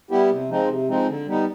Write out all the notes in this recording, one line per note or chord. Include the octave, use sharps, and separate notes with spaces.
G3 B3 E4 G4
C3
F3 G#3 C4 D#4
C3
F3 G#3 C4 D#4
D3
G3 B3 D#4